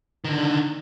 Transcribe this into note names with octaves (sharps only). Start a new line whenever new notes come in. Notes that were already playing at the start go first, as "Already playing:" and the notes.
D3 D#3